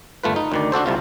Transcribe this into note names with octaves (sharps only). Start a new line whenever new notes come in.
G1 A3 F4 B4
D#4
D2 D#3 D5
D4 F#4 A4 C5
C2 C3 F4